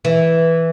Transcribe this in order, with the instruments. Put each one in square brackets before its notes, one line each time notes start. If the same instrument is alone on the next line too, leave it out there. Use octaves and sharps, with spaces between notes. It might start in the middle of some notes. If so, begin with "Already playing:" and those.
[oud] E3